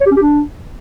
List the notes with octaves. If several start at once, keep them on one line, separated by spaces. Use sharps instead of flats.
C#5
G4
C#4
G4
D4